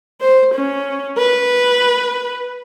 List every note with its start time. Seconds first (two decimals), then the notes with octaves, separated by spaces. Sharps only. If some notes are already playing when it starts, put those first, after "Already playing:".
0.21 C5
0.55 C#4
1.18 B4